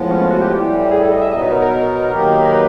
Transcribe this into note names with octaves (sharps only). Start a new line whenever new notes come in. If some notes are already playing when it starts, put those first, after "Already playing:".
Already playing: A2 F3 G#3 B3
C#4
F4
F#4
G4
A2 E3 G3
G#4
A4
D#5
E5
B2 F#3 B3 D#4 D#5
B4
A#4
A#4
D#3 F#3 A#3 D#4 G4
A#4
B4